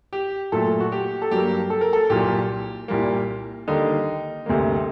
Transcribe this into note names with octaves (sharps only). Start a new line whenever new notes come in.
G4
A#2 F#3 A3 A4
F#4
G4
A4
G2 F#3 A#3 G4
A4
A#4
A4
C2 A#2 F#3 A#3 G4
C2 A#2 G3 A#3
D#2 D3 G3 A#3 D#4
D2 C3 G3 A#3